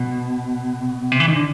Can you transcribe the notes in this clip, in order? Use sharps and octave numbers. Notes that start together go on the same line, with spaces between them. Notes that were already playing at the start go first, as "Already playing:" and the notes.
Already playing: B2
C3
E3
D#3
D3